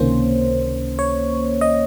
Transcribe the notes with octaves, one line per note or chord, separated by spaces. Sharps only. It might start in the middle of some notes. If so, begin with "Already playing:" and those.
Already playing: C#2 C3 D#3 A#3 C#4 C5
C#5
D#5